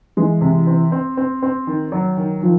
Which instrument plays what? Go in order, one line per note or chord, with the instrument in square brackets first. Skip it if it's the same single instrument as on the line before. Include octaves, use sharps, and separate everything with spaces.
[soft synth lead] E3 [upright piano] G#3
[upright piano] C3
C4
C4
C4
C4
D#3
F#3
D#3
[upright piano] D#3 [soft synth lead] F3